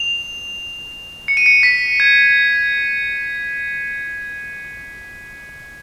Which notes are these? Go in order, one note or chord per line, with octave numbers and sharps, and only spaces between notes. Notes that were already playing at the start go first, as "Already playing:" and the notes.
Already playing: F7
C#7
D#7
C#7
B6
G#6